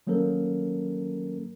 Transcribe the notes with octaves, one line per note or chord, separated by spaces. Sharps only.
D#3 F#3 A#3 C#4 A4 A#4